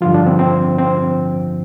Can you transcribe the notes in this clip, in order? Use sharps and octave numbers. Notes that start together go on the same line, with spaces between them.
G2 D3 F3 F4
D4
C4
C4
C4